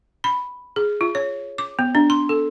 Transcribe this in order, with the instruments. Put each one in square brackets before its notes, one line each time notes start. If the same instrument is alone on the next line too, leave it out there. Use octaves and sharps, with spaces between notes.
[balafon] B5
G#4
F4
C#5
D6
B3
D4
C6
A4